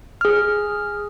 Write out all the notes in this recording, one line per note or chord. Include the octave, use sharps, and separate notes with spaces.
G#4 F6